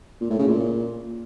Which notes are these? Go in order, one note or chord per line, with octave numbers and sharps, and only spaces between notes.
A#2
A2
C#3
A#2